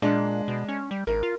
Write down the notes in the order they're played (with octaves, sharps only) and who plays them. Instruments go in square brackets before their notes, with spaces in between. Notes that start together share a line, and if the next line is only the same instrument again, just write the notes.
[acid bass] A#2 [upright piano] G#3 D4
[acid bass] B2
C#4
G3
[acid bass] G#1 [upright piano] A#4
[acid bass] F4